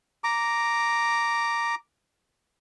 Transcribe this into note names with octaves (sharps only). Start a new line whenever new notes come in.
A#5 D6